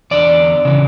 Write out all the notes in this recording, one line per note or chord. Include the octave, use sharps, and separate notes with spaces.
E2 D3 D5
C#3 E3